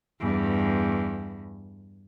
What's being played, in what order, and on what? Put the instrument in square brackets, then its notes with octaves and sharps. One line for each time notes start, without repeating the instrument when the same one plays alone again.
[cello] E2 G2